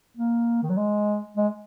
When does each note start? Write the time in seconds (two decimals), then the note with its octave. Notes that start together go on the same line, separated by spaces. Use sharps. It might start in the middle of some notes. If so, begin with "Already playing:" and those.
0.17 A#3
0.63 D#3
0.70 F#3
0.77 G#3
1.37 G#3